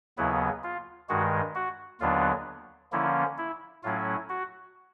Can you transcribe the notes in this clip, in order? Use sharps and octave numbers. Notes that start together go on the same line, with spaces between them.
D#2 C#3 F#3 B3 E4
F4
G2 D#3 G#3 F#4
F#4
D#2 D3 F#3 B3 D4 F4
D3 F3 A#3 C#4 E4
E4
A2 F#3 A3 C#4 E4 F4
F#4